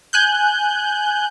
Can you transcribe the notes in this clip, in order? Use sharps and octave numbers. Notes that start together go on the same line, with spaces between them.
G#5 F#6 G6